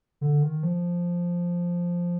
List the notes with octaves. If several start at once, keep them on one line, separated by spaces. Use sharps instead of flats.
D3
D#3
F3